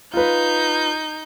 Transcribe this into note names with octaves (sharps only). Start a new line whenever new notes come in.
D#4 F4 B4 G6